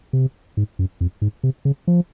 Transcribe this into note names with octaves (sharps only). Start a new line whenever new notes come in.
C3
G#2
F#2
F2
G#2
C3
C#3
F3